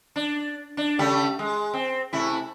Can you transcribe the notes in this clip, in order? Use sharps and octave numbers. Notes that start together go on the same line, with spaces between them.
D4
D4
C#3 G3 A3
G#3
C4
C3 A3 E4